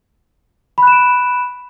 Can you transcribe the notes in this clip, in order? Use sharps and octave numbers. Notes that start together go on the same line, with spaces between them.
B5 F#6 D7 E7